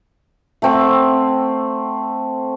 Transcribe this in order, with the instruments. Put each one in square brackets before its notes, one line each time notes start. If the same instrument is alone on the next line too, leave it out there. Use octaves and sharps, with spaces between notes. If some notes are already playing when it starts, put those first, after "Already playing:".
[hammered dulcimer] A3 C4 F#5